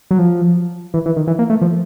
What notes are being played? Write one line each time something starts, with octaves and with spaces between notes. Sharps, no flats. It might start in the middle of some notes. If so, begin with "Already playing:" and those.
F#3
F3
E3
E3
D#3
E3
A#3
A3
F3